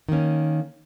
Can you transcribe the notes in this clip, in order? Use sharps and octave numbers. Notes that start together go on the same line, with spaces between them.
D#3 A#3 C#4